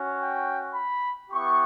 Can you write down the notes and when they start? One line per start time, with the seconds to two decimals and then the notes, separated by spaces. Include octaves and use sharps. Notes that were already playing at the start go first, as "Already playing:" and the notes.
Already playing: C#4 F#4
0.20 G5
0.74 B5
1.30 B3 E4 G4 C#6